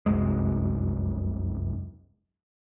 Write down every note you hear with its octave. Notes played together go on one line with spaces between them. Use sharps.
F1 C2 F#2 G#3